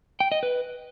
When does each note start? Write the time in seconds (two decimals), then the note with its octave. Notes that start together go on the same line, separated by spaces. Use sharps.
0.20 G5
0.32 D#5
0.43 B4